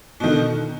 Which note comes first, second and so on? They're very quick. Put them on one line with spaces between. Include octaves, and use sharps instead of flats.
B2 D#3 D3